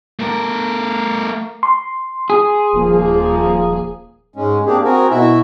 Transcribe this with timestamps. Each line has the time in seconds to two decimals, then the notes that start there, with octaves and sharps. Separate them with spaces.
0.19 A3 A#4
1.63 C6
2.30 G#4
2.73 D#1 F3 A#3
4.36 G#2 G#3 C#4
4.66 A#3 C4 D4 G4 G#4
4.84 C4 F#4 G#4 A#4
5.10 B2 E4 F#4 E5